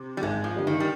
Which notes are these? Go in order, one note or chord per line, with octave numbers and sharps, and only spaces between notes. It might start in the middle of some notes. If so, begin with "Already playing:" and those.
Already playing: C3
G3
G#1 G#3
F3
G2 D3 G3
D#3
G3